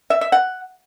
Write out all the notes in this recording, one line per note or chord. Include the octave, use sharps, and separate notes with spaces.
E5
E5
F#5